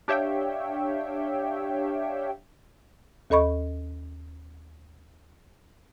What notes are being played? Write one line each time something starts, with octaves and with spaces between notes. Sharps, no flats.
D4 G4 C#5 E5 F5 G5
D#2 A4 D#5 B5 C#6